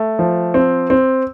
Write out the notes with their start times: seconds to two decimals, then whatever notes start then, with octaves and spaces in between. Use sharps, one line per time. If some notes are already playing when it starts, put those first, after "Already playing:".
Already playing: A3
0.19 F3
0.54 C4
0.90 C4